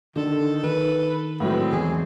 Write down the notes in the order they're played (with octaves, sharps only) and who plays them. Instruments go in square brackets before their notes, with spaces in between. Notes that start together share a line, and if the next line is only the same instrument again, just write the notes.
[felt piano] D3 [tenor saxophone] D#3 [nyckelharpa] A4
[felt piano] D#3 [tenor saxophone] B4
[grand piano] A2 F#3 [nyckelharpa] G#3 C4 [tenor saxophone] B4
[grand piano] E2 [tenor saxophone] G#4